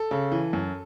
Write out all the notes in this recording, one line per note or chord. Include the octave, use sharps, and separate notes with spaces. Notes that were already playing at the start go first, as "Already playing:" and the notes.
Already playing: A4
C#3
E3
F#2